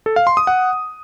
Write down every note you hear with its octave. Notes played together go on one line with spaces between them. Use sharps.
A4
F5
C6
D#6
F#5